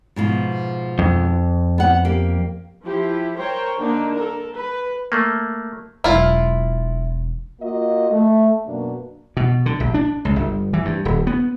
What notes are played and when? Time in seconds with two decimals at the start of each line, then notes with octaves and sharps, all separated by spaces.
0.16 G#2 B2 F3
0.99 F2
1.78 B3 F#5
2.05 A#3 G4
2.85 F3 E4 G4
3.36 A#4 C5 C#5 G5
3.80 D3 A#3 D4 D#4
4.15 A4 A#4
4.55 B4
5.12 A3 A#3
6.04 E1 F#3 E4 F4
7.60 A#3 F4 F#4 D#5
8.11 A3
8.66 F#2 B2 A#3 D4
9.37 B2
9.66 D3
9.80 A#1
9.94 D4
10.25 C#2
10.36 G1
10.73 E3
10.85 G2
11.05 D#1
11.27 B3